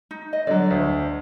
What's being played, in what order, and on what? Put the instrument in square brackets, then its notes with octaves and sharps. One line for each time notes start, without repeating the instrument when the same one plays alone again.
[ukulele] D#4
D#5
[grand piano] D3 F#3 [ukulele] D5
[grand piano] D2